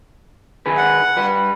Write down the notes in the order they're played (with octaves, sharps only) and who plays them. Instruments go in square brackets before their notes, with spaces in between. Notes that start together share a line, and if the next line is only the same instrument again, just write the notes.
[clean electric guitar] D#3 G#4 B4
[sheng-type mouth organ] F#5
[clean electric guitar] G3 B4